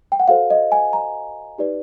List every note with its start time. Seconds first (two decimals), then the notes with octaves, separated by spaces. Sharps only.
0.12 G5
0.20 F#5
0.28 F#4 A4 C5 F5
0.50 D#5
0.72 G#5
0.93 A#5
1.58 D#4 G4 B4 D5